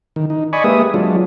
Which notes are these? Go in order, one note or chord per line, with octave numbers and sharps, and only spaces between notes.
D#3
D#4
D5 D#5 G#5 B5 C#6
G#3 A#3 G4 B4 E5 D#6
F#3 G#3 D4 F4